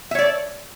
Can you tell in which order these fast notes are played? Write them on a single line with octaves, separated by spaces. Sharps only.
E5 C#5 D5